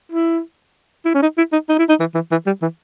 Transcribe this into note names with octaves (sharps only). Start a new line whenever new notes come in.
E4
E4
C#4
D#4
E4
D#4
D#4
E4
D#4
E3
E3
E3
G3
E3